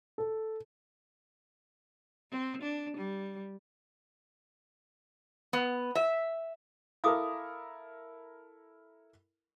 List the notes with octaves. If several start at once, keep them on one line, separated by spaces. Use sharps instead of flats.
A4
C4
D4
G3
B3
E5
E4 A4 A#4 F5 D6 D#6